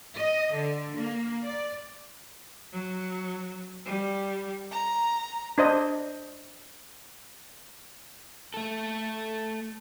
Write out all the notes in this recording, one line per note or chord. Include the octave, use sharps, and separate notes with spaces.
D#5
D3
A#3
D5
F#3
G3
A#5
D4 C5 D#5
A3 A4